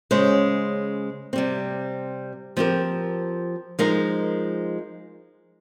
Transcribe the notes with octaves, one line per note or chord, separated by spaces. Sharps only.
C#3 G#3 C#4 G#4 C5
C3 G3 C4
F3 C4 G4 A#4
F3 G#3 D#4 A#4